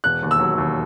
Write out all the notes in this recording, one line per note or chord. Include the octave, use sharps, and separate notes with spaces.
E1 F#6
D#2
E6
F#3
D#2